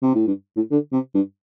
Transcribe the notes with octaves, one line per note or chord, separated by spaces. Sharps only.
C3
A2
G2
A2
D3
C3
G2